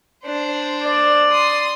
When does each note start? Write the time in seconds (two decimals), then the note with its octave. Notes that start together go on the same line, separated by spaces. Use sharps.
0.25 D4 C5
0.82 D5
1.30 C6 D#6